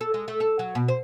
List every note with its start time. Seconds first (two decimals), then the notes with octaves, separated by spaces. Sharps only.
0.01 A4
0.14 G#3
0.28 A3
0.40 A4
0.59 F#3
0.75 B2
0.88 C5